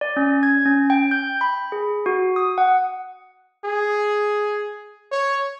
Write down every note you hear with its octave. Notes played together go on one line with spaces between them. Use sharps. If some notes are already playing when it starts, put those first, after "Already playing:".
D5
C#4
G#6
C#4
G5
G6
B5
G#4
F#4
D#6
F#5
G#4
C#5